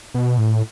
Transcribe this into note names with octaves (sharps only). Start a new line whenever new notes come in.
B2
A2